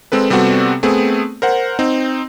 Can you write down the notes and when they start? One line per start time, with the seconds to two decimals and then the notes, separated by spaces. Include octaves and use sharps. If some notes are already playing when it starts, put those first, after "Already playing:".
0.12 G#3 C4 A4 B4
0.30 C3 G3 B3 C4 F#4 A4
0.83 A3 B3 C4 G#4
1.42 A#4 C5 F#5
1.79 C4 D#4